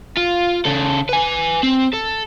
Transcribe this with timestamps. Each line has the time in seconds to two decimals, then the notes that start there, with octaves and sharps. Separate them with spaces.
0.17 F4
0.65 C#3 A4
1.09 B4 G#5
1.63 C4
1.93 A4